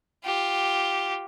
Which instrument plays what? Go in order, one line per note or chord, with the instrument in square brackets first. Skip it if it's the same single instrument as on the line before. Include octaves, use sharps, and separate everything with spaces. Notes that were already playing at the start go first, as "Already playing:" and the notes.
[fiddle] F4 G4